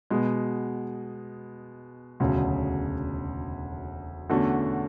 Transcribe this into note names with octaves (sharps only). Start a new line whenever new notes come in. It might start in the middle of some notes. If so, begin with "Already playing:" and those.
B2 G#3 B3
E1 D2 C#3 F#3
E2 D3 A3 C#4 F#4